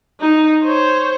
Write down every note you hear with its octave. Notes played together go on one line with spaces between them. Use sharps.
D#4
C5 C#5